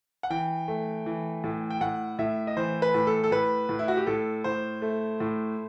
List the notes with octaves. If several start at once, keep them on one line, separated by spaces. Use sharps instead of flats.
F#5
E3 G5
A3
E3
A2
G5
A2 F#5
A2 E5
D#5
E3 C5
B4
A2
A4
A4
A2 B4
A2
E4
F#4
G4
A2 A4
A2 C5
A3
A2